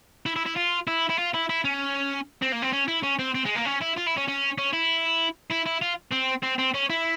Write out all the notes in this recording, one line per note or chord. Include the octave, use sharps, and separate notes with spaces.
E4
E4
E4
F4
E4
E4
F4
E4
E4
C#4
C4
A#3
C4
C#4
E4
C#4
C4
C4
G#3
A#3
C#4
E4
F4
E4
C#4
C#4
C#4
E4
E4
E4
F4
C4
C4
C4
C#4
E4